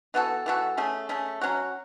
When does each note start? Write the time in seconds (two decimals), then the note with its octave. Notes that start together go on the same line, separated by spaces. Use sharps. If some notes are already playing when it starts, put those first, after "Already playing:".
0.14 E3 B3 F#4 A4
0.46 E3 B3 F#4 A4
0.77 A3 C#4 G#4
1.09 A3 C#4 G#4
1.41 F#3 C#4 F#4